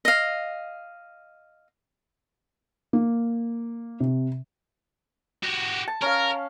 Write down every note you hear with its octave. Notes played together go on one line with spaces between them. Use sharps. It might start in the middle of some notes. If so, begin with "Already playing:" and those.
D#5 F5
A#3
C3
F#4 G4
A5
C#4 A#4 F5